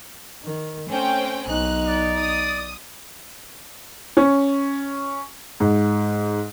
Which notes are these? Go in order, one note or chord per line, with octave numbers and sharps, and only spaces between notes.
D#3
A3 C4 C#4 G5
B1 D#4 F#6
D5
D#6
C#4
G#2